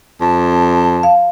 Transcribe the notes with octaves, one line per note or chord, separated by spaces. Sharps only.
F2 A5
F5